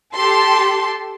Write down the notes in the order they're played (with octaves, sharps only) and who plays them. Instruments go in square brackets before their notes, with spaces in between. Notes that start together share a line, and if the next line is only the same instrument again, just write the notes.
[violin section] G4 A4 A5 C6